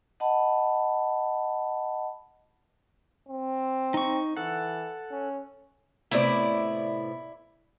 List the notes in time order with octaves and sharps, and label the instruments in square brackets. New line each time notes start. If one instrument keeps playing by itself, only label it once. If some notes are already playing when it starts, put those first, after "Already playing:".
[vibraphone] D#5 F#5 A5 B5
[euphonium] C4
[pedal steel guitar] D#4 C#6
[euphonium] E3 [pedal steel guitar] A4 F#5
[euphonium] C#4
[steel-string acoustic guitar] A2 C3 B3 [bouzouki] E4 D5